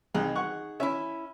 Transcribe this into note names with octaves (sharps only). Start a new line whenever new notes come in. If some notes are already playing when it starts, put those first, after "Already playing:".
C2 D#4 G#4
F#5 C#6
C#4 E4 E5